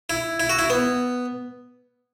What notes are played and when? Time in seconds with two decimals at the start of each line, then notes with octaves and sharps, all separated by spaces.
0.10 E4
0.40 E4
0.49 F#4
0.59 E4
0.70 B3